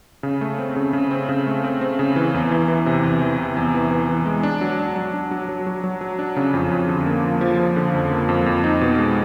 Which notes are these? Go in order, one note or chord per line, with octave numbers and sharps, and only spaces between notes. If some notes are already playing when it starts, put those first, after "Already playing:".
C#3
A3
C4
C#3
C#3
C4
C#3
A3
C4
C4
C#3
E3
E2
E3
E3
C3
E2
E3
C3
E2
E3
E3
E3
G#3
D4
F#3
D4
F#3
D4
F#3
F#3
F#3
F#3
F#3
D4
C#3
F2
F2
D3
A#3
F3
F3
F3
D3
F2
A#3
F2
F2
D#4
B2
G#3